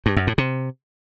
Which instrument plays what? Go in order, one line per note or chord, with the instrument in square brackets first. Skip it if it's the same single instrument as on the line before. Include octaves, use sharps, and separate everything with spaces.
[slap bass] G2
F#2
A2
C3